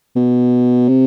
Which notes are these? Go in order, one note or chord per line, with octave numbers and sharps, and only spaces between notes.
B2
C3